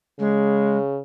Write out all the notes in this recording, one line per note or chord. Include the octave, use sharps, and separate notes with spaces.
C#3 G#3